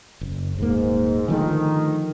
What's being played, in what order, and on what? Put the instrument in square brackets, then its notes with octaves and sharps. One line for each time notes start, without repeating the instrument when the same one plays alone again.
[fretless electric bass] F#1
[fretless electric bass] D#1 A#3 [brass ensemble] G#2
[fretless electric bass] D3 F3 A3 [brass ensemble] D#3